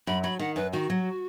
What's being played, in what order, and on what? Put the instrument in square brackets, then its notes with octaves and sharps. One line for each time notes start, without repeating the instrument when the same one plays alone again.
[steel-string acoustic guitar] F#2 [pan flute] B5
[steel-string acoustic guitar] F#3 [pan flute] B5
[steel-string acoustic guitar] D#3 [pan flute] F#5
[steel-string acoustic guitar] F#2 [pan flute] B4
[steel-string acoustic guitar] D#3 [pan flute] F#4
[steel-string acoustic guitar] F#3